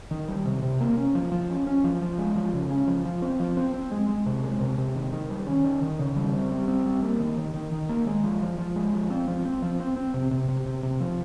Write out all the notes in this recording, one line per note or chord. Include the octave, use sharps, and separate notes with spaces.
D#3
G3
C3
C3
A#3
C#4
F3
F3
C#4
C#4
F3
F3
G#3
F3
C#3
C#4
F3
F3
C4
F3
C4
C4
G#3
G#3
C3
G#3
C3
C3
D#3
D#3
G3
C#4
D#3
D#3
C#3
G3
C4
G3
C4
G3
A#3
D#3
D#3
D#3
D#3
A#3
G#3
F3
F3
F3
G#3
F3
C4
F3
C4
F3
C4
C4
C3
C3
C3
C3
C3
F3